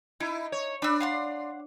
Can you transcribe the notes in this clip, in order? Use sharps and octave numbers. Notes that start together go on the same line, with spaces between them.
D#4 E4
C#5
D4 B5 E6
F5 F#5 C6